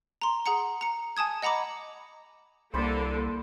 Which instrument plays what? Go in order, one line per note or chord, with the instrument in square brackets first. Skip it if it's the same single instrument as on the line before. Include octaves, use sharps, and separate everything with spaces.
[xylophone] A#5 C6
G#4 F#5 A#5 C#7
A#5 C#7
G#5 A5 D#6 G#6
D#5 F#5 A#5 B5 D6
[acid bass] C2 [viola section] D3 A#3 A4 [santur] C5 B5 D6